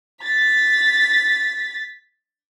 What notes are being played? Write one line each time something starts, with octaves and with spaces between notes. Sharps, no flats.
A6 B6